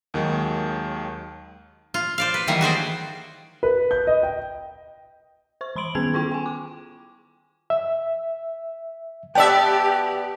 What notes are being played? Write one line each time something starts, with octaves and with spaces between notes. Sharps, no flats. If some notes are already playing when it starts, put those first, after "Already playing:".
D#2 D#3 F#3 G#3
F4
C5 D5 F5
B4
D#3 E3 F#3 G3 A#3
F#4 G#4 C5 D5
B4
G6
D#5
G5
C5 C#6
E3 B5 C6 D7 F#7
D#3 B3 C#4 G#4 G#6 F7
E4 F4 G5 C#6
G5 G#5
D6
E5
B3 G4 D5 E5 G5 A5